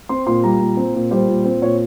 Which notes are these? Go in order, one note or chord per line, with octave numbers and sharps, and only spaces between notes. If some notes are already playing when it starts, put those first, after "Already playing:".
C4 C6
A#2 C6
G3 A#5
A#2
C4
A#2
G3 C5
A#2
C4
A#2 C#5